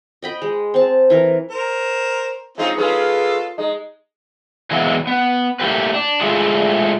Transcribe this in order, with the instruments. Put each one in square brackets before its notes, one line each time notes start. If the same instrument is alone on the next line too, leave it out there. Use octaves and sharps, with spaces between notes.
[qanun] D#5 G5 B5
G#3
C4 A5
E3 A#4
[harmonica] A#4 C5
[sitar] G#3 D#4 [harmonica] C4 C#4 F4
[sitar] G#3 C#4 G#4 [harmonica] F4 A4 [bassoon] B4
[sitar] G#3 [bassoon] D#4
[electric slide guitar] E3 F#3 G#3 A#3 B3 E4
B3
A3 A#3 E4 G4 B4
D4
G#3 A3 E4 F4 G#4